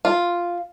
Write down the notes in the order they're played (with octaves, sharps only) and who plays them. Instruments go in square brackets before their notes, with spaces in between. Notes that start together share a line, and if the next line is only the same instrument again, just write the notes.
[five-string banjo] F4